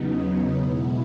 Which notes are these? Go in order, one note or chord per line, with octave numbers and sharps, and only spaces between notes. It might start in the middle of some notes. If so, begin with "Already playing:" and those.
Already playing: E2 C#3 F#3 B3 D#4
B2 G#3 B3 E4